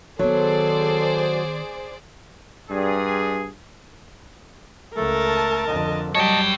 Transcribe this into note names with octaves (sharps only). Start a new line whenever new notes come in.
D#3 F#3 B3 G#4 A4 C5 D5
G2 G#4
C#2 A3 A4 A#4 A5
F2 D3 D#5
F#3 G3 C#5 D#5 G5 A5